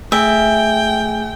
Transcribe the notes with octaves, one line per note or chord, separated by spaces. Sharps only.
A3 G#4 E5 G5 G#5